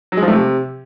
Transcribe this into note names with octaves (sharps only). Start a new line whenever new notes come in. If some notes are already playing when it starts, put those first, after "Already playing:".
F#3
G#3
F3
A3
C3